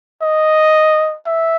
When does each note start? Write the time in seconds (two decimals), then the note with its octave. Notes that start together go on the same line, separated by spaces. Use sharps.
0.22 D#5
1.26 E5